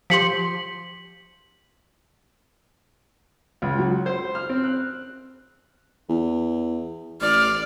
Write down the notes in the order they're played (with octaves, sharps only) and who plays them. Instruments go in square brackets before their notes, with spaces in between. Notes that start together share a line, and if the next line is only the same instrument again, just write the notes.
[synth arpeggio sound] F3 G4 C6 [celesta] B6 C#7 F#7
[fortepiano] C#2
F#3
C5
F6
C4
F#6
[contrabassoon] E2
[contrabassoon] A1 [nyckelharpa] D5 [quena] F6